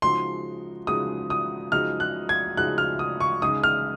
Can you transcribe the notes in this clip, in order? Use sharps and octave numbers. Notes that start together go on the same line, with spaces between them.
C#3 F3 G#3 D#4 F#4 C6
C#3 F3 G#3 D#4 F#4 D#6
D#6
C#3 F3 G#3 D#4 F#4 F6
F#6
G#6
C#3 F3 G#3 D#4 F#4 F#6
F6
D#6
C#6
C#3 G#3 D#4 G#4 D#6
F6